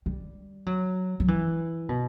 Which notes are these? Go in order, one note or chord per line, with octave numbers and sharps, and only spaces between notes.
G3
F#3
F#3
E3
B2